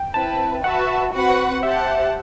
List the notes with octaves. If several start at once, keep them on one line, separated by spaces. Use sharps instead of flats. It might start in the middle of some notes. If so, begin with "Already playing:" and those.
Already playing: G5
C4 E4 B4 A5
F#4 B4 E5 F#5 A5
C4 F#4 B4 F#5
G4 C5 E5 F#5 A5